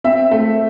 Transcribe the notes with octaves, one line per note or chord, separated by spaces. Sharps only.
C4 E5
A3